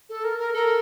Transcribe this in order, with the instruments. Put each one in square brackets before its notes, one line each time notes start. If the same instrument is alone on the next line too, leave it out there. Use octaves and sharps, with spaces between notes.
[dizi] A4
A#4
A#4
[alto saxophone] A4 [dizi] A#4